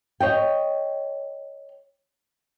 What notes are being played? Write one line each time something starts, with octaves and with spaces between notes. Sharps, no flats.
C#5 D#5 G5